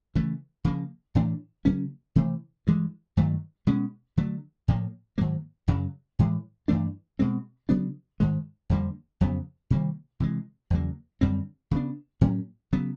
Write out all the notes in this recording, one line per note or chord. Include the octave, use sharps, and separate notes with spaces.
C#3 E3 A3
C#3 F3 A#3
A2 E3 A3 D4
C#3 F#3 A#3 C#4
C3 E3 A3
G2 E3 G#3
G2 D#3 F#3 A3
B2 G#3 C#4
D3 F#3 A3
A2 F3 A#3
G#2 D#3 F#3 A#3
F#2 C#3 F#3
A2 E3 G#3
G2 E3 A3 D4
B2 G#3 C4
C#3 F#3 B3 D4
G#2 D#3 G#3
F2 D3 G3 A#3
F2 C#3 F#3 B3
C3 D#3 G3 A#3
C3 E3 G#3
E2 C#3 F#3 A#3
F#2 D3 G3 C4
C#3 F#3 B3 D4
A2 F#3 A#3 C#4
C#3 F#3 B3